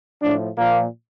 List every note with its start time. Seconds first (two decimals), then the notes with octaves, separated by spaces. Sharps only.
0.21 A2 F3 D4
0.57 A#2 F3 A#3